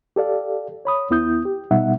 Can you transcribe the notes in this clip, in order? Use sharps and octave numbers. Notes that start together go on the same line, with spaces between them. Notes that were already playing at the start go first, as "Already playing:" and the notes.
G4 A4 D5 F5
C#5 B5 D#6
D#2 B3 E4 D#6 G6
G4
B2 G3 B3 D#4 E5 F#5